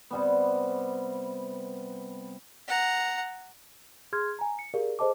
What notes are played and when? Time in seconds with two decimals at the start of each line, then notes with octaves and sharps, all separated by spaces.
0.11 C3 G3 B3
2.67 F#5 A#5
4.13 G#4 C6 F6 G#6
4.39 G#5 A#5
4.59 C#7
4.74 G4 G#4 A#4 D5 F5
4.99 G#4 A4 C5 D#5 A5 D6